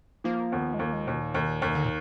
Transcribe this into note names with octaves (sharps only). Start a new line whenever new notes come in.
F3 A#3
D#2 B3
G#3
D#2 A#3
G#3
D#2 B2
A#2
D#2 B2
A#2
D#2 B2
D3
A#2